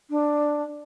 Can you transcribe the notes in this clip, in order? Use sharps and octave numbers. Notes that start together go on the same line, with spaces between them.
D4